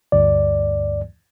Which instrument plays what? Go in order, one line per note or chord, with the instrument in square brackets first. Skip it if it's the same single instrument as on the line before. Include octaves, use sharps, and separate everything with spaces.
[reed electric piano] D2 G2 D5